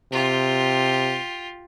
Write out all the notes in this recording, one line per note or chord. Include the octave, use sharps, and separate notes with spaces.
C3 F4 G4